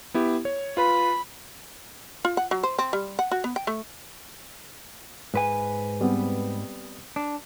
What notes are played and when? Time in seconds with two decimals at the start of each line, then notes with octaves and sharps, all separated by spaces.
0.14 B3 E4 G4
0.45 C#5
0.77 F4 B4 B5
2.25 F4
2.37 F#5
2.51 F#3
2.63 C5
2.79 C4
2.93 G3
3.19 F#5
3.31 F#4
3.44 B3
3.56 G5
3.67 A3
5.34 G#2 B4 G#5
6.01 G3 B3 C4
7.16 D4